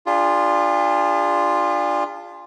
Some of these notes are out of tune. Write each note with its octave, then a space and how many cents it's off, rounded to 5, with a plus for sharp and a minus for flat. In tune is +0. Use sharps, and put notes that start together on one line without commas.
D4 +0 F4 +0 G#4 -45